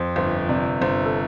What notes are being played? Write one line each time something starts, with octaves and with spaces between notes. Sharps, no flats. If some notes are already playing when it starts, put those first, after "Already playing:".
Already playing: F2 C5
G1 C5
C3 D5
G1 C5
A4